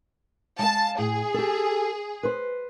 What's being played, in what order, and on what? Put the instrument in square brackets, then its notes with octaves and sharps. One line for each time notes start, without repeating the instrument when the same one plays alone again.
[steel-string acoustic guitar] G#3 F5 [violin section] A5
[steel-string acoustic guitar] A2 [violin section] G#4
[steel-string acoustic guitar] G4 A4
B4 C5